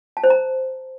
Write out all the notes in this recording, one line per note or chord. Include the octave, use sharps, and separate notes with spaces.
A5
C5
A#5